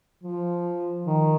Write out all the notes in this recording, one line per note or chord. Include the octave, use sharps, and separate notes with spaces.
F3
D#3